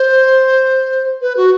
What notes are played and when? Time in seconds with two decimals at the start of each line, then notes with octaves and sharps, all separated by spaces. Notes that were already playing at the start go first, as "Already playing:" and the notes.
Already playing: C5
1.22 B4
1.37 F#4